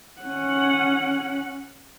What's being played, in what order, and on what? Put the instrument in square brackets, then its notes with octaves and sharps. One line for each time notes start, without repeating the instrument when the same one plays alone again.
[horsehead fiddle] C#4 F#5